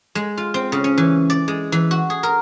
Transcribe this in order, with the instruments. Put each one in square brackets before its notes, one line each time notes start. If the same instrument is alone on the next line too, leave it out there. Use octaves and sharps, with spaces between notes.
[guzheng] G#3
F4
C4
C#3
C#4
E3
D5
G#3
E3
F#4
G#4
A#4